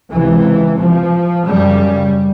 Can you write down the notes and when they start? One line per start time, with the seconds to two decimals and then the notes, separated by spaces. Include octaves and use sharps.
0.11 C#2 C3 E3
0.79 F3
1.46 F#2 C#3 G3